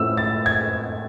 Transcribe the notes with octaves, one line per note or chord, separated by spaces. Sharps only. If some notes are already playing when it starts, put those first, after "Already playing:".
Already playing: A2 F3 A3 C#4 E6
A6
G#6